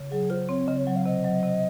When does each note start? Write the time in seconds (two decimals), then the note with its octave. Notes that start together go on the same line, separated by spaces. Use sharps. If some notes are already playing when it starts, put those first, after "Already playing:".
Already playing: C#3
0.11 F#3 G#4
0.30 F4 C5
0.49 C4 C#5
0.67 C#3 D#5
0.77 C#5
0.87 F#3
0.96 F5
1.06 C3 D#5
1.24 F#3
1.43 C3